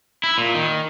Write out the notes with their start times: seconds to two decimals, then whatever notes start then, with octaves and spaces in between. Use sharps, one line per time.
0.24 E4
0.38 A#2
0.55 D#3